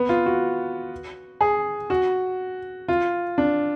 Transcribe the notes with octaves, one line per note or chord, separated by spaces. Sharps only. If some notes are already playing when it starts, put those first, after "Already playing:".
Already playing: B3
F4
F#4
G#4
F#4
F4
D4